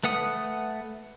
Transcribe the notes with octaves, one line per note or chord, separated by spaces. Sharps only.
A3 B4 F#5 D#6